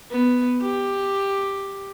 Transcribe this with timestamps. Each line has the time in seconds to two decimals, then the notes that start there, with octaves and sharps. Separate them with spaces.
0.11 B3
0.62 G4